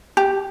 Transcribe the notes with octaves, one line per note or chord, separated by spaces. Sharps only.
G4